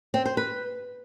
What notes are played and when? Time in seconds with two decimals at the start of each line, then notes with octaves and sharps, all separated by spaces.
0.14 C4
0.25 C5
0.37 B4